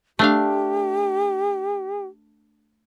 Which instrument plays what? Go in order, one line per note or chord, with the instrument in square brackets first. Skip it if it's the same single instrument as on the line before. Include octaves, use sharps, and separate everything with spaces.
[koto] A3 D4 F5 [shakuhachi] G4